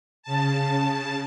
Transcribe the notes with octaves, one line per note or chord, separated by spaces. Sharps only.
C#3 A5